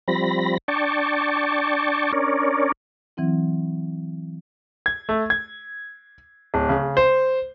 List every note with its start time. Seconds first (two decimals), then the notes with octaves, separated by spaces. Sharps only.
0.08 F3 G3 C4 B5 A#6
0.68 D4 D5 G5 A5 C#6
2.12 C#4 D4 A#4 C#5 D5
3.17 E3 F#3 C4 E4
4.86 G#6
5.09 A3
5.30 G#6
6.54 D1
6.69 C#3
6.97 C5